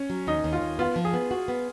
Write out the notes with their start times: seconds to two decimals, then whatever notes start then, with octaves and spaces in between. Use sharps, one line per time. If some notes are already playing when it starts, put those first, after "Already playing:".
Already playing: C#4
0.10 F#3
0.27 D#2 D#4
0.44 D#2
0.53 F4
0.62 D#2
0.79 B3 F4
0.96 F3
1.05 G#4
1.13 B3
1.31 F#4
1.48 B3